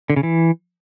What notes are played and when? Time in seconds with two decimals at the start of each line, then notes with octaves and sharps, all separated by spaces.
0.10 D3
0.16 C#3
0.23 E3